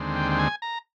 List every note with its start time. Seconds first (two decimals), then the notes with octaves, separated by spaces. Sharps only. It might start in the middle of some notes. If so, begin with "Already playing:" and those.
Already playing: D#2 D3 G#3 C4
0.16 G5
0.31 G5
0.39 G#5
0.62 A#5